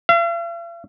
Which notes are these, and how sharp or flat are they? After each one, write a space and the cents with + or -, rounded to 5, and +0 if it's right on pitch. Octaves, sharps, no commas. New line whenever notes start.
F5 -45